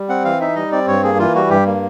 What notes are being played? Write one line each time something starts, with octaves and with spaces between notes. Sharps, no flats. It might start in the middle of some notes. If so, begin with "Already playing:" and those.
Already playing: G3
C4 F#5
E3 F5
D#4 E5
G3 D#5
C4 D5
G2 C#5
A#3 G#4
E3 F4
G3 F#4
G2 G4
A#3